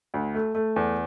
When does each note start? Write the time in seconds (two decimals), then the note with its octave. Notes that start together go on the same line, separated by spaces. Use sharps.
0.14 D2
0.35 A3
0.55 A3
0.76 E2